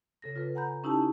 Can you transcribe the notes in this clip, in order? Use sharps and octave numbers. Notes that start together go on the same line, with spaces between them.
C#3 A4 A#6
F4 A4 B4
F#5 G#5 A#5 B5 G6
C#4 D#4 E4 G4 G#5 A5